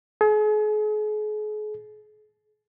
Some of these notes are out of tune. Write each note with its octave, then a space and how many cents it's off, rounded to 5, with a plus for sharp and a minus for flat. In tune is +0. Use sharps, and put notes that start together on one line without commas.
G#4 +40